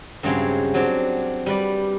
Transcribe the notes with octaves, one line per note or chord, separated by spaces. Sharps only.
G2 C#3 F#3 G#3 C4 C5
F#3 C4 D4
G3 B4 D5